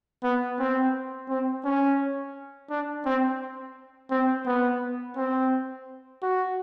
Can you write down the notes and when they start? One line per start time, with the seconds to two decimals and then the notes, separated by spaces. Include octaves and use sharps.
0.24 B3
0.59 C4
1.30 C4
1.65 C#4
2.70 D4
3.06 C4
4.11 C4
4.46 B3
5.17 C4
6.22 F#4